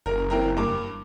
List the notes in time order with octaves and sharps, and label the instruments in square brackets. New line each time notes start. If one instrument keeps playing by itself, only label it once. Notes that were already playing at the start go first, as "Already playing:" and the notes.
[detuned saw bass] F#1 [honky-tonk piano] A#4
[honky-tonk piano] E3 C4 A#4
G2 A#3 D6